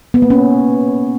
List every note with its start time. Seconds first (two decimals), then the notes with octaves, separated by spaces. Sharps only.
0.14 B3
0.22 A#3
0.30 C#4